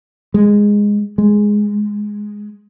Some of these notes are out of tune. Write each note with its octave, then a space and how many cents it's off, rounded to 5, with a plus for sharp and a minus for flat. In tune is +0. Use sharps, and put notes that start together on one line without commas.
G#3 -10
G#3 +0